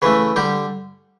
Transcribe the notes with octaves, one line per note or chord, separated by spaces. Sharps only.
C#3 E3 A3 B4
D3 G3 G4